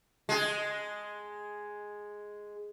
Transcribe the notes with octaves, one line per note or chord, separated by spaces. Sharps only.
G#3 G#4